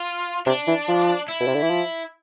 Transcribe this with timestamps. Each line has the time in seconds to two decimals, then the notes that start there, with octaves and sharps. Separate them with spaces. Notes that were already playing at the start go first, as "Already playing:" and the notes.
Already playing: F4
0.46 C3 D4
0.67 E3
0.88 F3
1.28 E4
1.40 B2
1.47 C3
1.55 D3
1.62 E3
1.70 F3